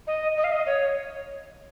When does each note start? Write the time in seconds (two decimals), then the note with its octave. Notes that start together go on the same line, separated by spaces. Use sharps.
0.07 D#5
0.37 D#5
0.44 F5
0.52 D#5
0.66 C#5